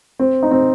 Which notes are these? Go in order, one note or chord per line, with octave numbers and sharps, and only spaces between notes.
C4
D#4
C4